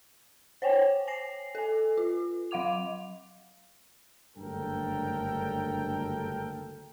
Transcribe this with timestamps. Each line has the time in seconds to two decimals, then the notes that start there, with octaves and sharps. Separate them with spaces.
0.62 C5 C#5 G5 G#5
1.07 G#5 A#6 C7
1.55 A4 G#5
1.98 F4
2.51 F#3 F5 F#5 D6 F7
4.37 F#1 D2 G2 A4 A#4 G5